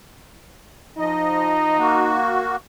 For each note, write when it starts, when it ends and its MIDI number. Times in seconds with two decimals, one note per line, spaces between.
0.98 1.77 53
0.98 2.19 63
0.98 1.77 75
1.78 2.56 58
1.78 2.56 66